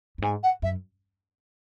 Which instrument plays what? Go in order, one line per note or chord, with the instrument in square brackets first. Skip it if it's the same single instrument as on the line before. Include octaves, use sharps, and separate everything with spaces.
[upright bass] F#2
[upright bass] G#2 [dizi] G#5
[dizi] F#5
[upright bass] F#2 [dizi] E5